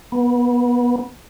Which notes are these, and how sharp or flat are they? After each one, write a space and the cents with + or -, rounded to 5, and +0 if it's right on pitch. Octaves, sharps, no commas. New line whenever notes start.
B3 -20